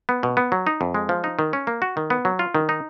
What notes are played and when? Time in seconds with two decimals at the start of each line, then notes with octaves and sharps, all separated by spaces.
0.09 B3
0.23 B2
0.37 B3
0.52 F#3
0.67 D#4
0.81 F2
0.94 G#3
1.09 F3
1.24 D#4
1.39 D#3
1.53 C#4
1.67 A#3
1.82 F#4
1.97 D#3
2.10 B3
2.25 F#3
2.39 F4
2.55 D#3
2.69 D#4